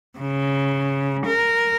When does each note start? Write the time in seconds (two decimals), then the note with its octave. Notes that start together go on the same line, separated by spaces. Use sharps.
0.19 C#3
1.26 A#4